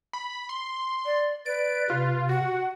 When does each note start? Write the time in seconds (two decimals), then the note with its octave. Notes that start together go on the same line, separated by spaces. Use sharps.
0.13 B5
0.49 C6
1.05 D5
1.46 B4 D5 D7
1.90 C3 F4
2.29 F#4 F#5